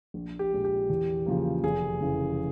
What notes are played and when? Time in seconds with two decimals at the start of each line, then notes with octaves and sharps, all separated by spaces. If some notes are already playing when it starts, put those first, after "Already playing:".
0.14 A#1
0.39 G4
0.52 A#2 G#3
0.65 G4
0.90 E2
1.26 C#3 F3 A#3
1.64 F1 G#4
2.01 F2 C#3 E3